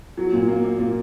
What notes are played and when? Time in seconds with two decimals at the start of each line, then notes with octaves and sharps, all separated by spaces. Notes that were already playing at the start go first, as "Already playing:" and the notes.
0.17 F#3
0.32 A#2
0.48 A#3
0.64 A#3
0.78 A#2